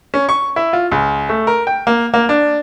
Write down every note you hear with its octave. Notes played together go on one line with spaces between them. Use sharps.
C#4
C#6
E4
F4
C#2
A3
A#4
G5
A#3
A#3
D4